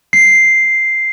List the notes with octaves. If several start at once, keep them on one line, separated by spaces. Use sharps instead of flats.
C7